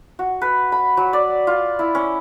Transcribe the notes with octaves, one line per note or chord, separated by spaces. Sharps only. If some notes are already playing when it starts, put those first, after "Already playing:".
F#4
B4
B5
F#3
D5
F4
E4
C#4